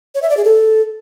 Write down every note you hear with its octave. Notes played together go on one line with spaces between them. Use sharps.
C#5
E5
D5
G#4
A4